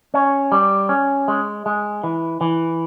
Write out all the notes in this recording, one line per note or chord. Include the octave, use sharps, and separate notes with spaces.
C#4
G3
C#4
G#3
G#3
E3
E3